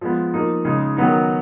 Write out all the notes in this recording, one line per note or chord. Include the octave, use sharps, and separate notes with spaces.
F3 G#3 B3
F3 A#3 D#4
C#3 G#3 D#4
D#3 F#3 B3 D#4